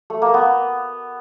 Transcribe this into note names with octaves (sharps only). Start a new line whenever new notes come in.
A3
A#3
B3